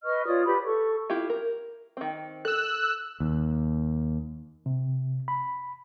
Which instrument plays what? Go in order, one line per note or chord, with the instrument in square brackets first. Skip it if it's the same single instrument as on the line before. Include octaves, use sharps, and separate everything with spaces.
[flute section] B4 D#5 C#6 F6
F4 C#5 D5 D#6
G4 B4 B5
A4 C#6
[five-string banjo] E4 F4 G4
A#4
D#3 C4
[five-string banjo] A4 [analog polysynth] E6 F#6
[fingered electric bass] D#2
[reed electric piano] C3
B5